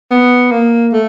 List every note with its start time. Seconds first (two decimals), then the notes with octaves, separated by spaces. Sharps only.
0.11 B3
0.51 A#3
0.93 A3